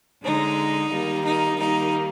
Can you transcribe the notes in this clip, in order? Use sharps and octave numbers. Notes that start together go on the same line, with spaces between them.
D3 G#3 D#4
D#3 G3 A#3
D#4
D#3 G3 A#3 D#4